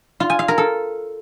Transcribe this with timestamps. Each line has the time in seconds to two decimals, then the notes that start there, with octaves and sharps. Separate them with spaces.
0.20 F4
0.30 G#5
0.39 F5
0.48 A#4
0.58 A4